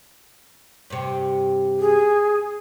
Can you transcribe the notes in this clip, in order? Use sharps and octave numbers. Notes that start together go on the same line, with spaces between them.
G2 C3
G#4